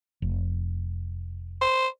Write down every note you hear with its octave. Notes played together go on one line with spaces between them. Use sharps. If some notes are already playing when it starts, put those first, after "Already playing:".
F1
C5